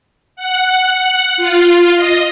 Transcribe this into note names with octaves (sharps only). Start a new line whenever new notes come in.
F#5
F4
D#5